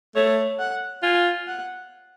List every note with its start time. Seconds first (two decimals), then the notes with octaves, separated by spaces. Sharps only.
0.15 A3 C#5
0.59 F#5
1.03 F4 G#5
1.48 F#5